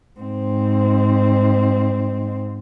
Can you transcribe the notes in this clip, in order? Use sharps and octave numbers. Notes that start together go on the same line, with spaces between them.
G#2 C4